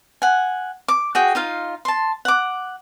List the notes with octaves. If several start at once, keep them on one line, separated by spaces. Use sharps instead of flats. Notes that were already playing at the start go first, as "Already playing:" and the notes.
F#5 G#5
D6
F#4 G#4 G5
D#4 F4 F5
A5 C6
F#5 D6